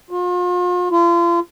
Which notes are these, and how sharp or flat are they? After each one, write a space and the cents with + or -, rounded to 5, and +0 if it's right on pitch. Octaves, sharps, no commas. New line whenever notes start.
F4 +40
F4 -35